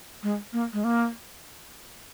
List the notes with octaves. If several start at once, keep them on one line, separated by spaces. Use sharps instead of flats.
G#3
A#3
G#3
A#3